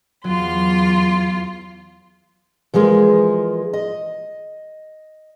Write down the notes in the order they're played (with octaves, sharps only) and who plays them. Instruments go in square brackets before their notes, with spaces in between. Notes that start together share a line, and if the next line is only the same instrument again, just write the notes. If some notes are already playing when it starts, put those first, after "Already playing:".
[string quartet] E2 F4 C6 [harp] F#3
[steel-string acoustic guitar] E3 F3 G#3 G#4 A#4
D#5